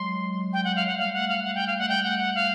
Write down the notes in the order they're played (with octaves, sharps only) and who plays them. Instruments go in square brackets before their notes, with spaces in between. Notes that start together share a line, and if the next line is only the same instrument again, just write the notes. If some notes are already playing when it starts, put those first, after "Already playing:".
Already playing: [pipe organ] F#3 G#3 [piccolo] C6
[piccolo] G5
F#5
F5
F#5
[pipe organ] G3 A3 [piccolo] F5
[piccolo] F#5
F5
F#5
G5
F5
F#5
[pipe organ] G3 A3 [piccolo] G5
[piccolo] F#5
F#5
F5